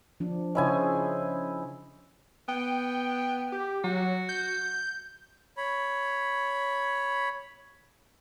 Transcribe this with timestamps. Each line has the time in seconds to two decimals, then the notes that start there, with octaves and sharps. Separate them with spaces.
0.20 F3 D4
0.55 C#3 C#4 E4 C5 D#5 G#5
2.48 B3 G5
3.52 G4
3.84 F#3 F#4
4.29 G6
5.57 C#5 B5